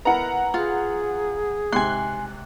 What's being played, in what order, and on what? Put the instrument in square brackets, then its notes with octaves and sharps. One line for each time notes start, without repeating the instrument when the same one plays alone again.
[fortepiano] B3 E4 A#4 [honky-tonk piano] F#5 A#5
[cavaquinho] F4 [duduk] G#4
[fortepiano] G#2 C3 [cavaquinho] G#5 C6 [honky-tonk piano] F#6